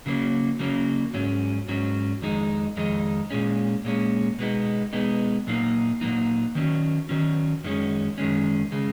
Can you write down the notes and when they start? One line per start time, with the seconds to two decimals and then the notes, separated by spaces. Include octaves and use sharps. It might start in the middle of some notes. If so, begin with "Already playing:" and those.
0.06 C#3 F#3 A#3 C#4
0.59 C#3 F#3 A#3 C#4
1.14 G#2 F#3 C#4
1.68 G#2 F#3 C#4
2.22 F2 D#3 G#3 D#4
2.77 F2 D#3 G#3 D#4
3.30 A#2 G#3 C#4
3.85 A#2 G#3 C#4
4.39 B2 G#3 B3 D#4
4.93 B2 G#3 B3 D#4
5.47 A#2 F#3 A#3 D#4
6.01 A#2 F#3 A#3 D#4
6.55 D#3 F#3 C#4
7.09 D#3 F#3 C#4
7.64 F#2 D#3 G#3 C#4
8.18 F#2 D#3 G#3 C#4
8.72 C#3 G#3